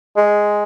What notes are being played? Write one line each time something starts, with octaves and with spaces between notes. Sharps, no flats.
G#3